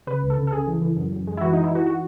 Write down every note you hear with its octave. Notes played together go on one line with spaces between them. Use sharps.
C#3 B4
C#2
A4
C#3
A4
C#3 G#4
E3
E3
F#2
F#2
G#3
E4
E3 F#4
E3 D#4
E4
E3 F#4
F#4